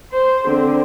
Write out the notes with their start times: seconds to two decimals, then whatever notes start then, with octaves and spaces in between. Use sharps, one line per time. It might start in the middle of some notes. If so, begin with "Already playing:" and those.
0.12 C5
0.46 D3 C4